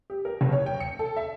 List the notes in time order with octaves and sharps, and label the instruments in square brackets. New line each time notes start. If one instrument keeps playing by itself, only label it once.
[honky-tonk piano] G4
A#4
F#1
C#5
G5
C#7
A4
E5